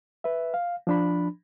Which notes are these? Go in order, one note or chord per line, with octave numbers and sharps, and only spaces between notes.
B4 E5
F5
F3 D4 B5